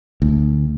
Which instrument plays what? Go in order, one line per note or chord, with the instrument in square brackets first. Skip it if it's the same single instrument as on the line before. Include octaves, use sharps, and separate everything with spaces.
[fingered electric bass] D2